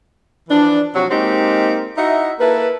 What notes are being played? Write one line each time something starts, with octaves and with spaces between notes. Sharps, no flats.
E3 F3 D4
C3 F3 F#3 F#4
G#3 A#3 C4 D#4 G4
D#4 E4 F#4 D#5 E5
A#3 E4 A4 B4